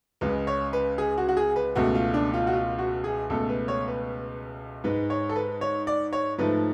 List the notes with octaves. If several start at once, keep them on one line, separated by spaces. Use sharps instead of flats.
C#2 C#3 G#3 B4
C#5
B4
G#4
F#4
F#4
G#4
B4
C#2 B2 A3 F#4
F4
D4
F4
F#4
F4
F#4
G#4
C#2 B2 A3 A4
B4
C#5
B4
G#2 G#3 B4
C#5
A4
B4
C#5
D5
C#5
G#2 F3 A3 B4